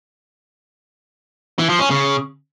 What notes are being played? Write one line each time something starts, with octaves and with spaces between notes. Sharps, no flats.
E3
F3
C#4
C#3